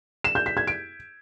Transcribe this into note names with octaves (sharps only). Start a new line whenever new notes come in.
E7
G6
B6
G#6
D7